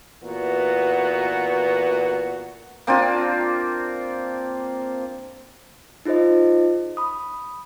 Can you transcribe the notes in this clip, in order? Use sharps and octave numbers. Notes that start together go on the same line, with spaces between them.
A#2 E3 B3 F#4
A#3 C4 D4 F4
D#4 F4 G#4 C5 D#5
B5 D#6